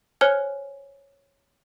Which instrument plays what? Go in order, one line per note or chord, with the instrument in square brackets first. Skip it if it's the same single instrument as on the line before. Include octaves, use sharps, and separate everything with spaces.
[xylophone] C5 C#5 G#5 F6 F#6 G#6